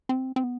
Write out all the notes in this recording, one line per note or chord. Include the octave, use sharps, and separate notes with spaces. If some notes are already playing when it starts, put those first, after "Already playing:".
C4
C4
B3